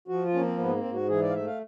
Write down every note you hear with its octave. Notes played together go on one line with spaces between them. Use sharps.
F3 F#4
F4
A#3 C#4
C4
G#2 B3
C4
G#2
F#4
E3 G#4
D5
F5
A3 E5
F5